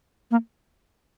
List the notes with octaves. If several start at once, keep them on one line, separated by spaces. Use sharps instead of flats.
A#3